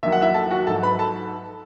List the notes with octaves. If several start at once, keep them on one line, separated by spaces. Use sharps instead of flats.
D#2 D#3 F#3 E5
F#5
E4 E5
A4 A5
F#4 F#5
G#2 F#3 A4 A5
B4 B5
A4 A5